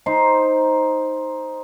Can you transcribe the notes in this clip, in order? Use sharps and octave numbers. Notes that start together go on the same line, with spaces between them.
D#4 C5 C6